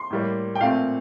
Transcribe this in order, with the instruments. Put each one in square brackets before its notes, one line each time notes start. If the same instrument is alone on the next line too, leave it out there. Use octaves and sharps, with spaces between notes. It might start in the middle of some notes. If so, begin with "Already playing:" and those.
Already playing: [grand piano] C6
A2 G3 A#3
G5
A#2 A3 C4 F5